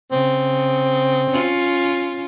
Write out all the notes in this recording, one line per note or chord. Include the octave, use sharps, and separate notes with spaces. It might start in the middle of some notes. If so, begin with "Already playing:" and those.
C#3 C4
C#4 F4